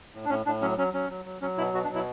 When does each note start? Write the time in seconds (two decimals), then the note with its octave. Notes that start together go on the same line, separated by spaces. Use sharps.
0.14 A2
0.25 D4
0.29 A2 C#4
0.46 A2 D4
0.61 F#3 C#4
0.78 F#3 C#4
0.94 F#3 C#4
1.10 F#3
1.25 F#3
1.41 F#3 C#4
1.58 B2 E4
1.74 B2 F#4
1.84 D4
1.89 F#3
1.95 E4